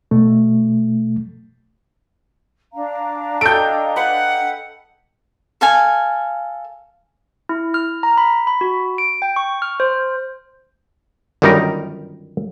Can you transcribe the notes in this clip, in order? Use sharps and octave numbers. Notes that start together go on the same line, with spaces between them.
B2 A3
D4 F5 A#5
A4 D#5 G5 G6 D7
B4 F#5
A4 F5 G#5
E4
F6
A#5
B5
B5
F#4
D7
G5
C#6
F6
C5
G1 F#2 D#3 G3 D#4 A#4